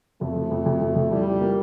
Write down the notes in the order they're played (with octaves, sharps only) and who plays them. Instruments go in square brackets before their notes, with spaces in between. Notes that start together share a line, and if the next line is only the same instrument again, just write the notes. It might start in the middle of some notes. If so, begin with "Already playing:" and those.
[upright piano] F2 [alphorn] A3
[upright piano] F3
F2
F2
F2
F2
[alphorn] G3 [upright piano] E4
[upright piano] F3
A#3